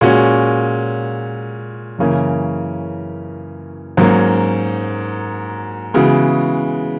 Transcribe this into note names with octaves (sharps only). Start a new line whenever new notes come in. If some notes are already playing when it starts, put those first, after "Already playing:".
A#2 G#3 C#4 F#4
F#2 C#3 E3 A#3 C#4
G#2 F#3 A#3 C#4
C#3 E3 G#3 B3 F#4